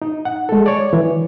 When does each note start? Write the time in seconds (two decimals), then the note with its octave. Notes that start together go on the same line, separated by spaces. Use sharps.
0.02 D#4
0.25 F#5
0.49 G#3 A4
0.66 C#5 D5
0.93 E3